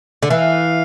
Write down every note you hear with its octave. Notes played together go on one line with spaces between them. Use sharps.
D3
E3 F5